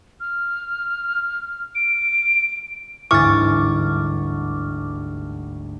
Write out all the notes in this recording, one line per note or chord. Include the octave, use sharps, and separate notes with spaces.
F6
D7
G1 D2 G#2 E3 C#6 D6 F6 A6